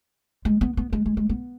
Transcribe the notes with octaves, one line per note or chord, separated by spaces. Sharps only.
G#3
B3
B3
G#3
G#3
G#3
B3